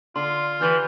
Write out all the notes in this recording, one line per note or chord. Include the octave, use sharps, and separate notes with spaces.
D3 F4 C6
E3 G4 B4 B5 F6 G6 A6